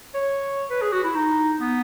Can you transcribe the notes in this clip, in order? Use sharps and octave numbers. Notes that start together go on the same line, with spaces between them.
C#5
B4
G#4
F#4
E4
D#4
B3